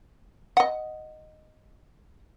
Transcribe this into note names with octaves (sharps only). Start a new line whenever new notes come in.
D#5 F#5